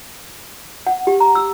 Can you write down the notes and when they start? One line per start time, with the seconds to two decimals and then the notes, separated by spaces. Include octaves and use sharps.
0.87 F#5
1.07 G4
1.20 A#5
1.35 E6